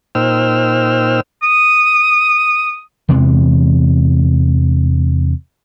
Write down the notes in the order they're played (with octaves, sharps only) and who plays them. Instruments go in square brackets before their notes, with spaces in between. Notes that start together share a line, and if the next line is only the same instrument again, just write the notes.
[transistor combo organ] A#2 D#4 C5 G5 E6 F6
[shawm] D#6
[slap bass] E2 C3 E3 G#3